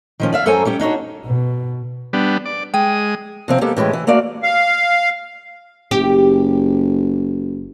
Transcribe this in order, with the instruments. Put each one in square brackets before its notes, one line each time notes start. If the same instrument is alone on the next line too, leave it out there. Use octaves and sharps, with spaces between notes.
[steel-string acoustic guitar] D#3 F3 C#4
D5 E5 F5
F#2 A4 C5 C#5 G#5 A#5
G3 C#4 G4
D4 D#4 F#4 C#5
[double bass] B2
[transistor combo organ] G3 B3 D4
D5
[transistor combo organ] G#3 D#6 [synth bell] G5
[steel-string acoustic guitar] C3 F3 C4
G#3 A#3 B3 G4 A4
A2 E3 G#3 G4
E3
A3 A#3 F#4 D5 F5
[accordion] F5
[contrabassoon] F#1 [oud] G4